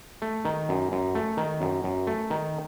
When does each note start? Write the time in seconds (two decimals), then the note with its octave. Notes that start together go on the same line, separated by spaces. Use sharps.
0.22 A3
0.45 D#3
0.69 F#2
0.92 F#2
1.15 A3
1.37 D#3
1.61 F#2
1.84 F#2
2.07 A3
2.30 D#3